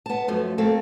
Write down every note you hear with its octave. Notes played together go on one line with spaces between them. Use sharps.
B3 A5
F#2 F3 A3
A3 A#3 C4 A4